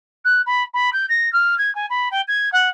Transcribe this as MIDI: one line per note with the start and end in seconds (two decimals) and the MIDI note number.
0.25 0.41 90
0.46 0.63 83
0.74 0.90 83
0.93 1.06 91
1.09 1.32 94
1.33 1.58 89
1.58 1.73 92
1.75 1.86 80
1.90 2.09 83
2.11 2.22 79
2.28 2.50 92
2.52 2.69 78